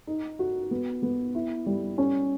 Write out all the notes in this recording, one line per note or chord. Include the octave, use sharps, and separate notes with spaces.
D#4
F#4
B3
B3
E4
G3
C#4